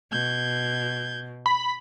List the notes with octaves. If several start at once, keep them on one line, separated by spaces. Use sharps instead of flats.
B2 G6 G#6
B5